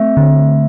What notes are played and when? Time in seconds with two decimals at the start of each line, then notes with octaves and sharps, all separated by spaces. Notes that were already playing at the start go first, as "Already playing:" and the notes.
Already playing: A3 C4 E5
0.17 D3